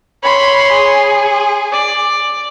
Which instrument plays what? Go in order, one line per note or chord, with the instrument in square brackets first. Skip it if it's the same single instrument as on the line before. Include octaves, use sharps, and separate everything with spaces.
[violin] C#5 C6 [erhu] B5
[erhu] G#4
[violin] D5